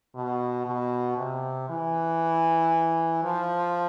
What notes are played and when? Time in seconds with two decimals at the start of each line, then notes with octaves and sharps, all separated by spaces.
0.15 B2
0.66 B2
1.18 C3
1.69 E3
3.23 F3